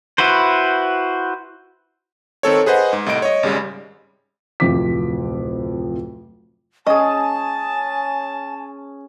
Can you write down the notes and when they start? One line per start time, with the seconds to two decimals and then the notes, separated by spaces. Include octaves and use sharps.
0.18 E4 F#4 B4 C5
2.43 D#3 C4 A4 C#5
2.66 G#4 B4 C5 D#5 F#5
2.93 G#2
3.06 C2 A2 D#5 D7
3.22 C#5 D#5
3.43 G#1 C#3 G3 G#3
4.60 D1 F2 C3 F3 D6 B6
6.87 C#4 G#4 D#5 G#5 A5